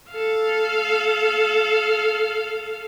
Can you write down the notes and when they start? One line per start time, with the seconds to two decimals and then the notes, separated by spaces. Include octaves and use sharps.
0.11 A4 F5